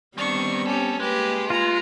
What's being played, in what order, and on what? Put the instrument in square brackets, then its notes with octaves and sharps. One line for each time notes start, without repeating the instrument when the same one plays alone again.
[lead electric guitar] D#3 [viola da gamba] G3 B3 C4 [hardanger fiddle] D4 C#6
[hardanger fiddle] C#4 G4 [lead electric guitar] A4
[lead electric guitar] G#3 [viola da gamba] A#3 B4 [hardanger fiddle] G4
[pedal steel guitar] F4 [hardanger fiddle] A#5